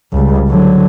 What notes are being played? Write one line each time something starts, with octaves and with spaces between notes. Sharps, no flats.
C#2 G3
D3 F#3